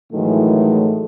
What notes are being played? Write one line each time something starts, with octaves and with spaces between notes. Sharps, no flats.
A2 D#3 E3 F#3 G#3 A3